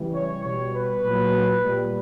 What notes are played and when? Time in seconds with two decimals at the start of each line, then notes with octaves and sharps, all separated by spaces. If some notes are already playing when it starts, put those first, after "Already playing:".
Already playing: C#3 E3 G3
0.13 C#5
0.43 B2 G3 C#5
0.74 B4
1.04 A#2 F#3
1.64 A#2 G3